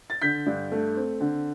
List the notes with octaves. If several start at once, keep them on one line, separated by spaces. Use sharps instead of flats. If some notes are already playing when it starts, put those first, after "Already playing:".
A6
D3 G6 B6
G2
A3
C4
D3